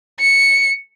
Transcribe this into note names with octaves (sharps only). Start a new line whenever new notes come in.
C#7